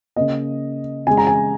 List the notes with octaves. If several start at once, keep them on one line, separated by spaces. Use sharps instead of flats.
C#3 A#3 D#5
C#3 G#3 G#5
A#5
G#5